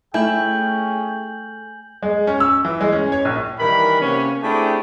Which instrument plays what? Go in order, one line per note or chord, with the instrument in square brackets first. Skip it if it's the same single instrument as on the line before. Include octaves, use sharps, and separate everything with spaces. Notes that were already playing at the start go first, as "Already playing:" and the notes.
[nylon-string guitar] A3 [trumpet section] C#4 G#4 G5 [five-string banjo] E4 [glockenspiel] G#5 G6 F#7
[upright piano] G#3
C#4
E6
E3
G#3
C#4
C#5
A#1
[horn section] D#3 E3 G3 A#4 B4 B5
C3 A#3 B3 C#4
A3 C4 D4 E4 G4 G#4